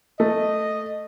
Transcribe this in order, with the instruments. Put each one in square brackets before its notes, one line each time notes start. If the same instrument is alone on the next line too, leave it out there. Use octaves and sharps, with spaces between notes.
[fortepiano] A3 [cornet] D#5